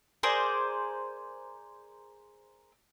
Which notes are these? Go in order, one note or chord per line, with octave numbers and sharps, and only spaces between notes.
G#4 A#4 C5 D5